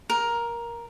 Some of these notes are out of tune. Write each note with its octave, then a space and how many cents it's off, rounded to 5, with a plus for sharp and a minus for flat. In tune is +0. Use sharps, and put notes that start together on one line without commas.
A#4 +10